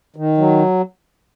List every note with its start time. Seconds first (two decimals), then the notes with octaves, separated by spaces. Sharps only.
0.16 D#3
0.37 F#3